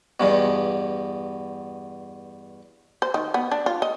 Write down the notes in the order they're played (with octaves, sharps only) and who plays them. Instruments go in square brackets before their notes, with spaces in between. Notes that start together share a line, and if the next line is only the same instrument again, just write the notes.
[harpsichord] E2 G2 B2
[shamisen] C5
D#3
B3
D4
F4
D#5